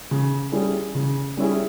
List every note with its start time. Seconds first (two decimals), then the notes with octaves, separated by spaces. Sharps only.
0.11 C#3
0.52 G3 C#4 E4 G#4
0.95 C#3
1.37 G3 C#4 E4 G#4